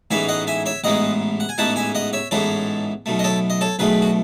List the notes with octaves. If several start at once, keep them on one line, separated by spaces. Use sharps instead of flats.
A1 G#2 E3 G#3 B3 E5 G#5
D#5 F#5
E5 G#5
C#5 E5
A1 G#2 E3 G#3 B3 D#5 F#5
F#5
G#5
A1 G#2 E3 G#3 B3 F#5 A5
E5 G#5
D#5 F#5
C#5 E5
A1 G#2 E3 G#3 B3 A4 C#5
B1 B2 A3
D#5
A4 C#5
D#5
A4 C#5
B1 B2 A3 G#4 B4
F#4